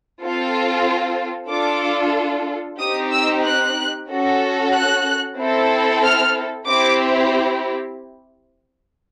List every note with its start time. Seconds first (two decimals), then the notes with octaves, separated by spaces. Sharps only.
0.22 C4 F4 A4
1.50 D4 F4 A4 D6
2.80 C4 D#4 G4 D#6
3.12 E6
3.45 F#6
4.09 C#4 F#4 A4
4.73 F#6
5.38 C4 E4 A4
6.04 F6
6.67 C4 E4 G4 D6